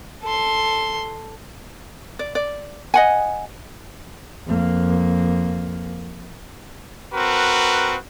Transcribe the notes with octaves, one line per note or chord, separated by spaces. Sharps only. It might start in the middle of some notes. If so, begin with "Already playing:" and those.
A4 C6
D5
D5
D#5 F#5 G#5
F2 A#3
C4 F#4 A#4 B4